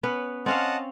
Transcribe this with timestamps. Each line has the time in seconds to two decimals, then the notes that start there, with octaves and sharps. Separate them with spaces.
0.03 B3 C#4 B4
0.46 C4 C#4 D#5 F5 F#5 A5